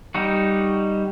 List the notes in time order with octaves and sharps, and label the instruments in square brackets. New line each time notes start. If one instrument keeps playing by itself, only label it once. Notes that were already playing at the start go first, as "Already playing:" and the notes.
[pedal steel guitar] G3 D#4 F#4